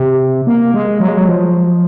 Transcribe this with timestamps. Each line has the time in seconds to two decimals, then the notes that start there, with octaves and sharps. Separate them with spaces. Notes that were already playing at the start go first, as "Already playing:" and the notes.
Already playing: C3
0.47 A#3
0.74 G#3
1.00 F#3
1.08 G#3
1.17 F#3
1.27 F3